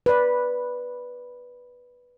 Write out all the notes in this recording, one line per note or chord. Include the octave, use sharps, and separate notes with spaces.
B4 D5